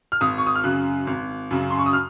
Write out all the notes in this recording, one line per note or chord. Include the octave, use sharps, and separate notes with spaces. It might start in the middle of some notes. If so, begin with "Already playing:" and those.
F6
G#1 D#6
C#6
D#6
F6
F#2 C#3 F#6
G#1
F#2 C#3
C6
C#6
D#6
F6